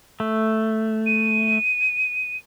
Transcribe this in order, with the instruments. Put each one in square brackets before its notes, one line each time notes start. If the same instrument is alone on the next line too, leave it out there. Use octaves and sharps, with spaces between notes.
[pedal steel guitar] A3
[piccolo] D#7